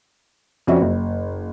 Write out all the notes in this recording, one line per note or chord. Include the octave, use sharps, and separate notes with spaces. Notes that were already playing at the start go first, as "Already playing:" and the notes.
F2 C#4 F#4 D5 E5
F#1